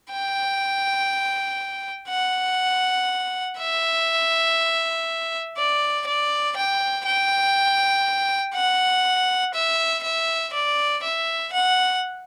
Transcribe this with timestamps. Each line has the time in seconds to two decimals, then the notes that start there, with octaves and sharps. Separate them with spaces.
0.12 G5
2.10 F#5
3.59 E5
5.57 D5
6.06 D5
6.56 G5
7.06 G5
8.55 F#5
9.54 E5
10.03 E5
10.53 D5
11.03 E5
11.52 F#5